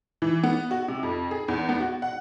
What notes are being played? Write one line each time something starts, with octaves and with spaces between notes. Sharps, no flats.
E3
B3
F#4
C3
F2
G#4
E2
B3
F#4
F#5